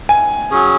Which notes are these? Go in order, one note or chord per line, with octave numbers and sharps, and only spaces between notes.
G#5
F#3 C#4 G#4